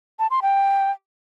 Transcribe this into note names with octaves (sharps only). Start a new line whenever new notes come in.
A5
C6
G5